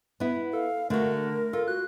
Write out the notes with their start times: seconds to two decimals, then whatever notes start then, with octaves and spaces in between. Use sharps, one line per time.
0.20 B3 E4
0.53 A4 F5
0.90 D3 A3 F#4 A#4
1.53 F4 A4
1.68 F#4 F#6